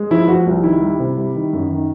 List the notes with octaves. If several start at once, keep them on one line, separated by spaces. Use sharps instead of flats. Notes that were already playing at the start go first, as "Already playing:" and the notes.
Already playing: G#3
F3 E4
F3 F#4
C2
D#3 E4
G3
C3
G3
D#3
F#2
D#3